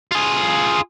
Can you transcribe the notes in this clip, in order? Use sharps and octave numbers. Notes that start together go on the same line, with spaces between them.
F4 G#4